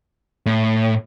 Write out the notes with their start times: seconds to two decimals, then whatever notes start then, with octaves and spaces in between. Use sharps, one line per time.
0.46 A2